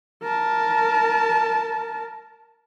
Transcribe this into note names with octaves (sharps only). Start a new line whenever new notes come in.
A#4 A5